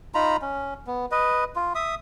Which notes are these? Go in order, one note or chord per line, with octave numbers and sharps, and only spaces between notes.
D#4 F4 A#5 B5
C#4
B3
B4 D#5
F4
E5 D#6